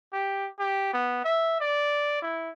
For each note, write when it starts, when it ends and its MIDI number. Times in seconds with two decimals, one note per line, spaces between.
0.13 0.47 67
0.59 0.91 67
0.93 1.24 59
1.24 1.60 76
1.60 2.20 74
2.22 2.49 64